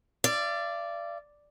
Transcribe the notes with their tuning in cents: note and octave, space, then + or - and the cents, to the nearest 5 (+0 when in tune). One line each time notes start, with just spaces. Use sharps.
D5 +0 F5 -45